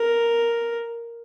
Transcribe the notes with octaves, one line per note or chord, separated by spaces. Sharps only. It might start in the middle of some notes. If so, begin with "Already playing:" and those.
Already playing: A#4